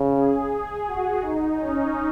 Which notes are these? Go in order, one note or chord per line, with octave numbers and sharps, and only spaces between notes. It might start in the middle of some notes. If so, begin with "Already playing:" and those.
Already playing: C#3
G#4
G#4
F#4
D#4
C#4